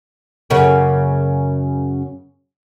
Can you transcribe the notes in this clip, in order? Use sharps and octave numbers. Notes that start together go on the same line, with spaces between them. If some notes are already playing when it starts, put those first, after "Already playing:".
F#2 C#3 A#3